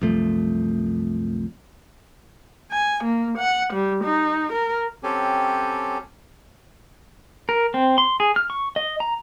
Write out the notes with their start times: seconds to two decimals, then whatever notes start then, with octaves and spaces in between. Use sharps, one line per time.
0.02 C2 F#2 F3 A3
2.72 G#5
3.04 A#3
3.38 F#5
3.73 G3
4.04 D#4
4.53 A#4
5.03 F#3 C4 C#4 G4 A4 G#5
7.49 A#4
7.74 C4
7.98 C6
8.20 G#4
8.36 F6
8.50 C#6
8.76 D#5
9.00 A#5